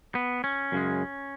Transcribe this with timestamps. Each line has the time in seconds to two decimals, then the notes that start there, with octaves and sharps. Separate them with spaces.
0.15 B3
0.44 C#4
0.72 F#2 C#3 G#3